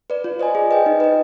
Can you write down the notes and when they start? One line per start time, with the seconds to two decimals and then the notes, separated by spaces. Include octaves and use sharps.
0.10 B4 D5
0.24 F4
0.39 C5 D#5 G#5
0.55 G#4
0.71 B4 D#5 G5
0.86 D#4
1.00 B4 D#5